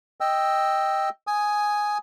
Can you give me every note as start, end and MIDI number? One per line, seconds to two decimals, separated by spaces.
0.21 1.09 75
0.21 1.09 79
0.21 1.09 88
1.27 1.98 80
1.27 1.98 87